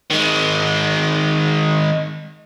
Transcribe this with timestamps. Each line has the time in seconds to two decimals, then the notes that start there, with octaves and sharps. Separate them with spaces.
0.10 D#3 G#3